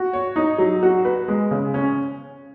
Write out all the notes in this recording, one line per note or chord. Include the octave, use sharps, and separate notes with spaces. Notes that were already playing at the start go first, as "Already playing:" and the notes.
Already playing: F#4
C#5
D#4
F#3
F#4
B4
G#3
C#3
C#4